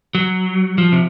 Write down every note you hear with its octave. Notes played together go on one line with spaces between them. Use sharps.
F#3
F3
C3